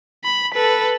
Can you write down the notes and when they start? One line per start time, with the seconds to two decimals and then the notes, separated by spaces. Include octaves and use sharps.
0.24 B5
0.54 A4 B4